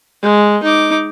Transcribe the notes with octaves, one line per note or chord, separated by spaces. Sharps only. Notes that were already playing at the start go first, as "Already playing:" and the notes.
G#3
D#4 D6